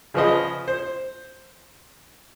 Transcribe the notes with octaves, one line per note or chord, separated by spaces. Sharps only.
C#3 F3 G#4 B4 C5 D#5
C5